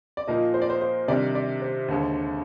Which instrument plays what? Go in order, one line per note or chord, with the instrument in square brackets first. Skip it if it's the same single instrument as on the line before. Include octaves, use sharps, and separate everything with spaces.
[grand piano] D5
[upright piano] A#2 F3 A#3 D#4 [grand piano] D#5
[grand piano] C5
D5
C5
C5
[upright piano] C3 D#3 G3 D4 [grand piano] D5
[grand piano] D5
C5
[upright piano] D#2 D3 G#3